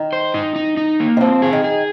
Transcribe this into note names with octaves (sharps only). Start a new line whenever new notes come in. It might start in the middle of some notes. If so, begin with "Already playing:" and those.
Already playing: D#3
C5
D#4
D#4
D#4
A#3
D#3
F3 C4
G#4
D#3
G#4